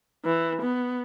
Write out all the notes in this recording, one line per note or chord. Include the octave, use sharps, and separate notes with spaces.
E3
B3